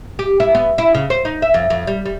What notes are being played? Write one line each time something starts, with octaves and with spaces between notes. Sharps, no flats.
G4
E4
B3
E4
C#3
C5
D#4
E5
F2
F2
G3
G3